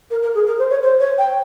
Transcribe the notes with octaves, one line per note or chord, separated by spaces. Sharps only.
A#4
A#4
G#4
A#4
C5
C#5
C5
C#5
G5